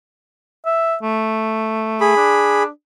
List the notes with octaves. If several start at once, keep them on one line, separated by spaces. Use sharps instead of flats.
E5
A3
G#4 B5
D4